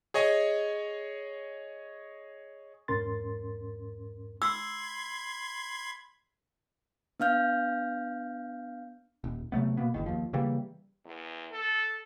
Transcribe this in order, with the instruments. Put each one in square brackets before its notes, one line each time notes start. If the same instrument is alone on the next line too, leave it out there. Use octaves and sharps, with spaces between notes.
[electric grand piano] G#4 C#5 D#5 G#5
[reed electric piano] E2 G#2 C#4 A#4 C6 A6
[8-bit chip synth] B5 C6 G#6 [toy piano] E6
[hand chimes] B3 D4 F5 F6 G6
[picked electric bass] D#1
C3 F#3 A3 B3
B2 A#3 B3
F#1 E2 D#3
D#2 F3
C#3 E3 G3 A#3
[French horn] E2
A4